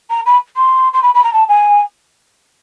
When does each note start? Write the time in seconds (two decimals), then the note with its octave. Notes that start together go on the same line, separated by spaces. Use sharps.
0.10 A#5
0.26 B5
0.56 C6
0.93 C6
1.02 B5
1.14 B5
1.24 A#5
1.33 A5
1.48 G#5